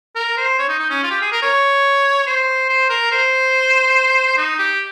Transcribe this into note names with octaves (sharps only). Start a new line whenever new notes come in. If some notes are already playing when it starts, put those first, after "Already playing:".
A#4
C5
C#5
D#4
D#4
C#4
F4
G4
G#4
A#4
C#5
C5
C5
A#4
C5
D#4
G4